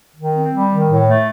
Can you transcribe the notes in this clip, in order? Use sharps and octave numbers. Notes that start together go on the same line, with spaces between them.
D#3
C4
G3
D#3
A2
A3